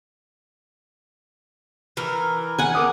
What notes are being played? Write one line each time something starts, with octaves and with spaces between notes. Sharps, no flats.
E3 A#4
F#5 G#5
A#4 D6 D#6